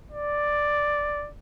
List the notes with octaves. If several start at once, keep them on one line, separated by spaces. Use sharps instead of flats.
D5